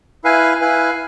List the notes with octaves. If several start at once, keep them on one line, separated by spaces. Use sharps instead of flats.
E4 B4 F5 G#5
E4 B4 F5 G#5